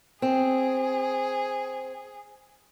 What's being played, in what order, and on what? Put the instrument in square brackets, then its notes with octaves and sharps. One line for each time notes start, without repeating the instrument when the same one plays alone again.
[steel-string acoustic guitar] C4 [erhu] G#4